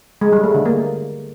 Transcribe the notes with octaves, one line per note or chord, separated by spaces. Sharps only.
G#3
G3
A3
D3
A#3